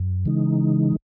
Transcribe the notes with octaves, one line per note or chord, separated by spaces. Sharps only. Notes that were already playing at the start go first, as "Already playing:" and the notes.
Already playing: F#2
C#3 E3 G#3 D#4